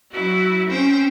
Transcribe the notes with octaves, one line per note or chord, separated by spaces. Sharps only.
F#3 E4 F#4
C4 C#4 C5 G5 E6